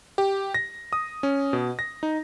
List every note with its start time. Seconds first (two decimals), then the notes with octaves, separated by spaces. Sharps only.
0.18 G4
0.54 A#6
0.93 D#6
1.23 C#4
1.53 B2
1.79 A#6
2.03 D#4